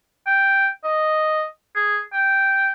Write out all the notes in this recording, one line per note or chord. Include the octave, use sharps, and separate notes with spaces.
G5
D#5
G#4
G5